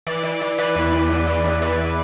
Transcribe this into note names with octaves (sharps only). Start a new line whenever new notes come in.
E3 D5
E3
E3
E3 B4
E2
E2
E2
E3
E2
E3